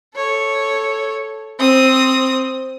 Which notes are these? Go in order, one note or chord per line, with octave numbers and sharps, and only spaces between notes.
A4 C#5
C4 D#6